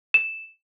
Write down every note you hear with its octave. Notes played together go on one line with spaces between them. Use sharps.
E7